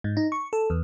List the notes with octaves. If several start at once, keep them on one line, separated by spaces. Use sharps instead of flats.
G#2
D#4
C#6
A4
E2